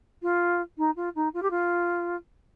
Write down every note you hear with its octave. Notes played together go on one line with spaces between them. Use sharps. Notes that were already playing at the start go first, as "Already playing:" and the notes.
F4
D#4
F4
D#4
F4
G4
F4